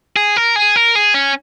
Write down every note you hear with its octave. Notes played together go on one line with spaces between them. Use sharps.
G#4
A#4
G#4
A#4
G#4
C#4